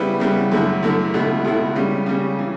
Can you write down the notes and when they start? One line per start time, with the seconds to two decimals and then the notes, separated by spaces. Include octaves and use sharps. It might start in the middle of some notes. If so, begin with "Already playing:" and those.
Already playing: C#3 G3 B3 E4 B4
0.20 C#3 G3 B3 E4 B4
0.52 F#2 D3 A3 E4
0.83 F#2 D3 A3 E4
1.14 C#2 B2 A3 E4
1.44 C#2 B2 A3 E4
1.75 C#3 G3 C#4
2.06 C#3 G3 C#4
2.37 C#3 E3